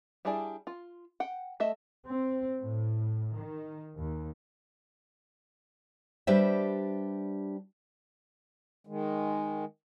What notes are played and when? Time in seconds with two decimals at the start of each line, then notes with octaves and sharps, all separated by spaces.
0.25 G3 D4 E4 G#4 D5
0.67 F4
1.20 F#5 G5
1.60 A3 D#5 E5
2.06 C4
2.62 A2
3.36 D#3
3.97 D#2
6.27 G3 D4 G4 B4 C5 E5
8.87 D#3 G#3